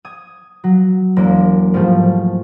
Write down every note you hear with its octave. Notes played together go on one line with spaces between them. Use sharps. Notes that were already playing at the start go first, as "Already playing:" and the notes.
D#6 G#6
F#3
E1 A#3
G#2 F3 G3 A3